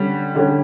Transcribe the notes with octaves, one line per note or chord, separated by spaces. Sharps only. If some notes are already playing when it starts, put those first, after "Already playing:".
Already playing: D3 G3 C#4
D3 G3 C#4